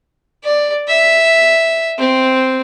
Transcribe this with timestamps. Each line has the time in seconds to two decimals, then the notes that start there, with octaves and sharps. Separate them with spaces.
0.43 D5
0.88 E5
1.98 C4